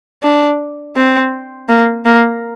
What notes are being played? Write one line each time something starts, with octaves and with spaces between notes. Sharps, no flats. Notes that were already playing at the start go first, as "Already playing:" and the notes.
D4
C4
A#3
A#3